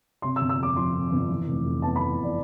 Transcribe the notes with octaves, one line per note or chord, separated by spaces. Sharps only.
C3 C6
E6
G1
E6
F2 D6
F3 C6
C3
G1
E3
F1
F2
B3 A5
B5
E3
F1 D5